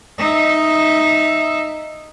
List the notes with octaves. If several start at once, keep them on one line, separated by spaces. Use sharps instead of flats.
D#4 E5